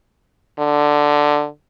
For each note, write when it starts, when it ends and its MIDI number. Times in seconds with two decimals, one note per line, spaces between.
0.59 1.47 50